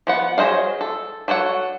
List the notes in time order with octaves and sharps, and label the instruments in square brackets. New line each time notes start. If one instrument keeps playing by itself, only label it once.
[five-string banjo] F3 B3 F#5
F#3 G#4 C5 D#5 F5
A4
F#3 A4 C#5 F#5